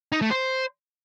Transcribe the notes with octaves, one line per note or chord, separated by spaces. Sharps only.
D#4
A3
C5